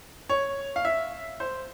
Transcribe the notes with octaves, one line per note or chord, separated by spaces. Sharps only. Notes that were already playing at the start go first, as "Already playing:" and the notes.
C#5
F5
E5
C5